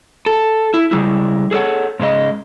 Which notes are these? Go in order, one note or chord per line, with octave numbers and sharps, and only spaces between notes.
A4
E4
C#3 G3 G#3 E4
G#4 A4 C#5 F#5
G#2 C#3 G#3 D#5